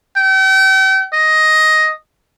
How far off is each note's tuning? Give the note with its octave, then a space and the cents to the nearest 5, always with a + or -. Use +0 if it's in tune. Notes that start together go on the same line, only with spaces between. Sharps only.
G5 -40
D#5 +10